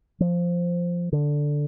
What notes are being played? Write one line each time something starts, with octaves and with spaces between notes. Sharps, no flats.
F3
D3